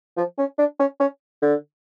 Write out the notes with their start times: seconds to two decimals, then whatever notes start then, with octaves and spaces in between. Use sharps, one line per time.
0.17 F3
0.38 C#4
0.58 D4
0.79 C#4
1.00 C#4
1.42 D3